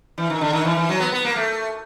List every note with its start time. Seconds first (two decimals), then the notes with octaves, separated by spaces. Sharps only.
0.18 E3
0.30 D#3
0.41 D3
0.53 D#3
0.65 E3
0.77 E3
0.89 F#3
1.00 B3
1.13 B3
1.25 A#3
1.36 A3